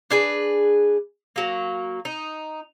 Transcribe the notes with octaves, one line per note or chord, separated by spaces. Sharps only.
D4 G#4 B4
F#3 A#3
D#4